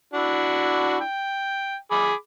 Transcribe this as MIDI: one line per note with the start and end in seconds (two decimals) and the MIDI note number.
0.13 0.99 62
0.13 0.99 64
0.13 0.99 66
1.01 1.75 79
1.91 2.14 68
1.91 2.14 83
1.91 2.14 86